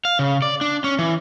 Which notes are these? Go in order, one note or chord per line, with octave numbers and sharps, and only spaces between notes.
F5
C#3
D5
D4
C#4
E3